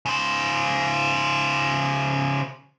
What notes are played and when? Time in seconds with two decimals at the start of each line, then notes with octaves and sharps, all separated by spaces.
0.06 C#3 C5